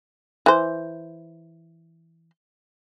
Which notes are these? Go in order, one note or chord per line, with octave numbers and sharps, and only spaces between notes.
E3 C5